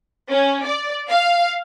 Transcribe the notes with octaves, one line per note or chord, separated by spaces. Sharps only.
C#4
D5
F5